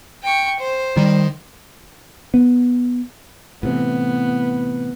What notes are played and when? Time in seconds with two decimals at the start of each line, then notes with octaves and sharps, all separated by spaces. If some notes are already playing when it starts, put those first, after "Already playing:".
0.23 G5 C#6
0.59 C5
0.97 D#3 G3
2.34 B3
3.63 A2 C3 E3 B3